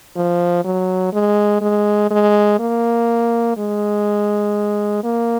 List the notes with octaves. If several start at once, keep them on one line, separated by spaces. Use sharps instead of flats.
F3
F#3
G#3
G#3
G#3
A#3
G#3
A#3